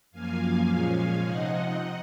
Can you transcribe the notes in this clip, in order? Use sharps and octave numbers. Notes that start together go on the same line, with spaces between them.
F#2 F3 A#3 F5 G#5
A#2 F3 G#3 C#4
C3 F3 C4 D#4 D#5 F#5